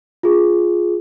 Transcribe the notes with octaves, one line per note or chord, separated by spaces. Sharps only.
F4 G#4